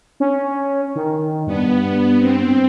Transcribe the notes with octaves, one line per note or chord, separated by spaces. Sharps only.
C#4
D#3
G2 B3
C4